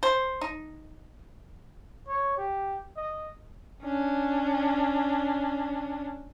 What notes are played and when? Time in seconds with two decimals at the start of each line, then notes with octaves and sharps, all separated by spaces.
0.03 C5
0.41 D#4
2.08 C#5
2.38 G4
2.97 D#5
3.83 C#4 D4